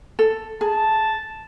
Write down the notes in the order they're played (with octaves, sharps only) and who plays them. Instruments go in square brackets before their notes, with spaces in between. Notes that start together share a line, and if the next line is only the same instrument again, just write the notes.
[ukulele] A4
[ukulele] G#4 [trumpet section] A5